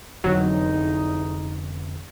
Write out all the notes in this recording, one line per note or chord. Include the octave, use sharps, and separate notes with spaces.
F1 B1 E2 D3 F#3 C4 D#4